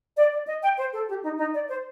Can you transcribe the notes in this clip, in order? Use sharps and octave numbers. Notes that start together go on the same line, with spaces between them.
D5
D5
D#5
G5
C5
A4
G4
D#4
D#4
D5
C5